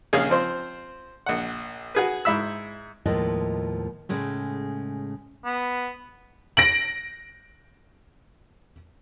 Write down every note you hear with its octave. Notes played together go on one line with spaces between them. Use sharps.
A#1 C#4 G#4 F5 F6
F3 C4 C5 C6
A#1 F#5
F#4 G#4 B4
G#2 E4 B5 E6
D#2 A2 F3 G#3 B4 D#5
A2 C#3 G#3 A3
B3
A#6 D7 F#7